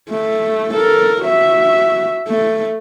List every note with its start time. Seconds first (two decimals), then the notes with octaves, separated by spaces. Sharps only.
0.10 A3
0.75 A4 A#4
1.23 F#4 E5
2.28 A3